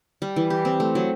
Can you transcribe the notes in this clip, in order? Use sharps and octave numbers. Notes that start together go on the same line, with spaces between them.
G3
E3
G4
C4
A3
F#3